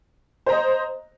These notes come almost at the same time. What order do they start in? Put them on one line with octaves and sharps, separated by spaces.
C5 A#5 D#5